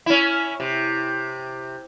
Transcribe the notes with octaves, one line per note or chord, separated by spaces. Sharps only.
C#4 E4
C3